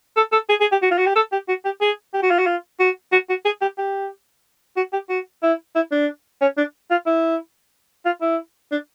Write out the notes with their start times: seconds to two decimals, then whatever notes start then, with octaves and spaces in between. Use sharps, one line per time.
0.17 A4
0.32 A4
0.49 G#4
0.60 G#4
0.72 G4
0.82 F#4
0.91 F4
0.98 F#4
1.06 G4
1.15 A4
1.32 G4
1.48 F#4
1.65 G4
1.81 G#4
2.14 G4
2.22 F#4
2.30 F4
2.38 F#4
2.46 F4
2.79 F#4
3.12 F#4
3.29 F#4
3.45 G#4
3.61 G4
3.78 G4
4.76 F#4
4.93 G4
5.09 F#4
5.42 E4
5.75 E4
5.92 D4
6.41 C#4
6.57 D4
6.91 F4
7.06 E4
8.05 F4
8.21 E4
8.72 D4